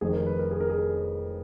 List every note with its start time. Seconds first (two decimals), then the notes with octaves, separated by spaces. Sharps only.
0.01 F1 F2 D#3 G#4
0.13 A#4
0.26 B4
0.39 A#4
0.51 G#4
0.60 A#4
0.70 G#4